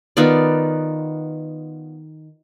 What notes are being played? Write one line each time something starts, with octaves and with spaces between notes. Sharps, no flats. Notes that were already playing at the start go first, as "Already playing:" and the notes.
D#3 B3 F4 D5